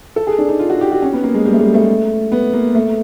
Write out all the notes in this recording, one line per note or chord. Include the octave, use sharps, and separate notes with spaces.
A4
G#4
D4
D#4
F4
F#4
G4
F#4
C#4
B3
A#3
G#3
G3
A3
G#3
A3
B3
A#3
A3